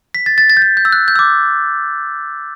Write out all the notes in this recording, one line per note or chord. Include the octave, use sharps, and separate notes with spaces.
B6
A6
A6
A6
G6
A6
G6
E6
F#6
G6
E6
D6